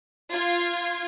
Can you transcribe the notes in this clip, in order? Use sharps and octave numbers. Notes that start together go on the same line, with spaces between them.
F4 G#6